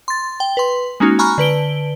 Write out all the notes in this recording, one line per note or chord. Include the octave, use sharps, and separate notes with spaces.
C6 A6
G5
B4 C6
G#3 A#3 C#4 D#4 F#4
G#5 A#5 B5 C#6 F6 F#6
D3 B4 D7 G7